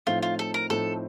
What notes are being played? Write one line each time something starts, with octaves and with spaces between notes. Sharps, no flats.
A2 F3 A3 C4 D#4 F4
F4
A4
A#4
A2 F3 A3 C4 D#4 A4